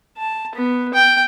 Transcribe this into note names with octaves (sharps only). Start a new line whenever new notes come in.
A5
B3
G5